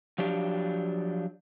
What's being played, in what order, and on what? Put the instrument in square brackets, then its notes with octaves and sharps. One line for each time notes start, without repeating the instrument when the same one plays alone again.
[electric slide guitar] F3 F#3 D4 G4